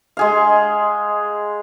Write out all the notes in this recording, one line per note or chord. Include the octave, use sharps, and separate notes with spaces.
G#3 G#4 F5